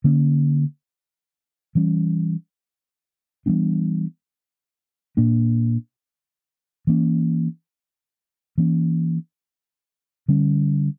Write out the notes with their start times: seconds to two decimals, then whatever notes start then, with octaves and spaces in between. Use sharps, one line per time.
0.04 D3 A#3 C#4
1.75 E3 G3 C#4
3.46 E3 G3 B3 D4
5.17 A#2 A#3 D4
6.87 E3 A#3 C#4
8.58 E3 A#3 C#4
10.28 D3 G3 C#4